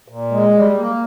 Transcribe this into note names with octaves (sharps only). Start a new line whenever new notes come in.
A#2
G#3
G3
A#3